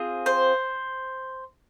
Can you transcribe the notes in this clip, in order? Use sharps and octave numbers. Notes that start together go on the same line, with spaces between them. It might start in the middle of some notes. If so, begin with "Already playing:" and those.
Already playing: C4 F4 G#4
C5